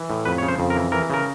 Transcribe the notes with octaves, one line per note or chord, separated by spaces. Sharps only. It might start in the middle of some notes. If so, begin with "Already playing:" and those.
Already playing: E3
A2
F2 B4
C#3 C#5
C5
F2
A#4
E3
E3 A#4
C#3 A#4